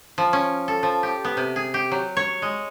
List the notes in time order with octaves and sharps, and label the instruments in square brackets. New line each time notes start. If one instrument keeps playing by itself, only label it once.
[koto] F3
C#4
A4
F3
G4
B3
C3
G#4
G4
F#3
C#5
G#3